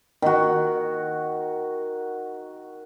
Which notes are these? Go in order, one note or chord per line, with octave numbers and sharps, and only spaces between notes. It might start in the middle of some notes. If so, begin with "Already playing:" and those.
D#3 F#4